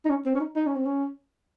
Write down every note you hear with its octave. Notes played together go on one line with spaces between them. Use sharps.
D#4
C#4
C4
C#4
D#4
D#4
C#4
C4
C#4